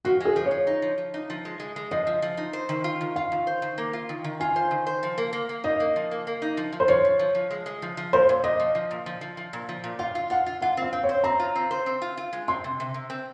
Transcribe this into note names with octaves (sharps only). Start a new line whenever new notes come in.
F3 F#4
G#3 G#4
F3
C#5
F3
D#4
F3
F3
D#4
F3
G#3
G#3
G#3
F3 D#5
F3
F3
D#4
C5
D#3
F4
D#3
F4 F5
D#3
C5
D#3
A#3
F4
D#3
D#3
F4 G#5
C5
D#3
C5
F3
A#3
A#3
A#3
D#4 D#5
A#3
F3
A#3
A#3
D#4
F3
F3
C5
F3 C#5
F3
F3
F3
G#3
G#3
F3
F3
A#2 C5
A#2
A#2 D#5
F3
F3
A#2
F3
F3
F3
A#2
F3
A#2
F4 F5
F4
F4 F#5
F4
F4 F#5
C4 F5
C4
C#5
C5
C4 A#5
F4
C4
C5
C4
F4
F4
G#3
C4 C6
C3
C3
C3
C4